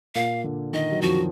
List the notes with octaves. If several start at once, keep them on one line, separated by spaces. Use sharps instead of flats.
A#2 A#3 F5
D3
D#3 D#5
F#3
F2 F3 F#4